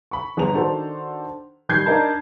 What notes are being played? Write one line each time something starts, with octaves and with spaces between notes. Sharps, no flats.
B5 C#6
G1 G#4 A#5 F7
D#3 D4 F#4 A4 C5
D#3 G3 G6 G#6 C7
D4 D#4 A#4 A5 B5